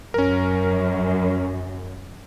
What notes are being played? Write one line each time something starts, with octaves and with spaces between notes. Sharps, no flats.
F#2 C#4 A#4